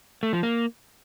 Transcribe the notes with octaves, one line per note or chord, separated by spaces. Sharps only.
A3
F3
A#3